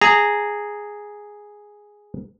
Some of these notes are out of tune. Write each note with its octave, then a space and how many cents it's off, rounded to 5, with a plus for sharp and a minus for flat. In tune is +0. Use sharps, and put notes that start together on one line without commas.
G#4 +0 A#5 -20